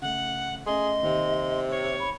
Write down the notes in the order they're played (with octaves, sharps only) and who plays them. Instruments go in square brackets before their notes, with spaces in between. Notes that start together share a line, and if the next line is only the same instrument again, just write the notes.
[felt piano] C#3 A3 [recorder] F#5
[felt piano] A3 C#4 [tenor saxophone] G#4 [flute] D#5 [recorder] C6
[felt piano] D#2 [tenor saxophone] C3
[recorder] C#5
[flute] B5